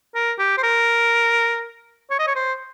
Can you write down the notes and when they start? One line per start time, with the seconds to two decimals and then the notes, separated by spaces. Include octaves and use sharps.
0.15 A#4
0.39 G4
0.58 C5
0.63 A#4
2.11 C#5
2.19 D#5
2.27 C#5
2.36 C5